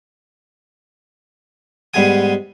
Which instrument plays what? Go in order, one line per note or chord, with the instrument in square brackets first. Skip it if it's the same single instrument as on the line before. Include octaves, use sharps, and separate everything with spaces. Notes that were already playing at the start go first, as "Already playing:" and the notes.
[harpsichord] G#2 G3 B3 G#4 G#5 D#6